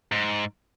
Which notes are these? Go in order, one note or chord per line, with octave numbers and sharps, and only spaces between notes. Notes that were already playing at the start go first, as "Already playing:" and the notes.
G#2